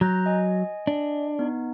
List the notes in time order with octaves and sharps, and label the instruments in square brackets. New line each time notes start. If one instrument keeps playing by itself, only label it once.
[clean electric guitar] F#3 [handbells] A#5 F#6 G6
[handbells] D#5 G#5
[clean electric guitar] D4
[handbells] B3 D#4